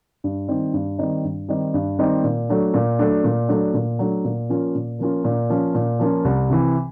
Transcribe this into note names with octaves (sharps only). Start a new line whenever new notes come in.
G2
D#3 G3 C4 D#4
G2
D#3 G3 C4 D#4
G2
D#3 G3 C4 D#4
G2
D#3 G3 C4 D#4
A#2
F#3 A3 D4
A#2
F#3 A3 D4
A#2
F#3 A3 D4
A#2
F#3 A3 D4
A#2
F3 A#3 C#4 F4
A#2
F3 A#3 C#4 F4
A#2
F3 A#3 C#4 F4
A#2
F3 A#3 C#4 F4
C2
C3 E3